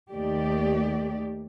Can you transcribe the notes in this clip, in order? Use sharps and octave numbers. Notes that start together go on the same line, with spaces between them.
D#2 D#3 A3 G4 D5